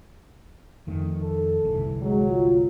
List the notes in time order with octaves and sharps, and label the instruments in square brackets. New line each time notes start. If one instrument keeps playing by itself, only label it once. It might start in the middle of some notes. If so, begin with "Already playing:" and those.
[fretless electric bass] F2 D#3 A3
[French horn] A4
[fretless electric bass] G1 C2 E3
[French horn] F#3 [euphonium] G#3
[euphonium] F4